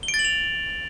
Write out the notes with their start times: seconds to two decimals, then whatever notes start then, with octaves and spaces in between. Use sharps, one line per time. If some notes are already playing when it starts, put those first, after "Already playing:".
0.03 G7
0.08 D7
0.14 A6
0.19 F#7
0.25 F7